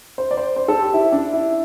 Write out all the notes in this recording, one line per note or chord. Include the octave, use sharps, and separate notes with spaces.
C5
D5
C5
C5
A4
G4
E4
D4
E4